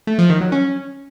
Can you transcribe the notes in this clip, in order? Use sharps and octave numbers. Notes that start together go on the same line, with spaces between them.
A3
F3
D#3
F#3
C#4